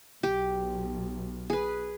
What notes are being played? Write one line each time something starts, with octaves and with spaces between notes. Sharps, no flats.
B1 G4
G#4 B4